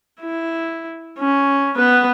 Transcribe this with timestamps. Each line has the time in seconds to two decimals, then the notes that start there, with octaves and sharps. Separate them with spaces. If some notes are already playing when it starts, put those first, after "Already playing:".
0.20 E4
1.19 C#4
1.76 B3 B4